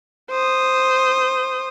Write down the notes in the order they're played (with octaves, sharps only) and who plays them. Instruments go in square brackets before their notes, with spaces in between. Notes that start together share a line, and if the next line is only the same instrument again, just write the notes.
[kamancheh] C5 D#6